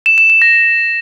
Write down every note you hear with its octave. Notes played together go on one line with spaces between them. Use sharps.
E7
E7
E7
A#6